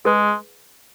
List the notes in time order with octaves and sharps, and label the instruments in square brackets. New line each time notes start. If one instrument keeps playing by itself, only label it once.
[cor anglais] G#3 [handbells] G#4 B4